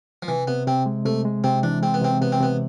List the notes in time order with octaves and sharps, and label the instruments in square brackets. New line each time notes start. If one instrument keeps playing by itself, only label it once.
[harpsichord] F3
[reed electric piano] C3 [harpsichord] E3
[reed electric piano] C3 [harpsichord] B3
[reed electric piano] C3 [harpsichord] C4
[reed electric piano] G#3
[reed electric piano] C3 [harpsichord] A3
[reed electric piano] G#3
[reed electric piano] C3 [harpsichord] C4
[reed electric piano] E3 [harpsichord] D4
[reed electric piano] G#3 [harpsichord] C4
[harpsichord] B3
[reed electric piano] C3 [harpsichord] C4
[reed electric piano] C3 [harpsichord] B3
[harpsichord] C4
[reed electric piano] C3 [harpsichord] B3